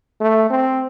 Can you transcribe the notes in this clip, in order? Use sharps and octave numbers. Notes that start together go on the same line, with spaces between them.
A3
C4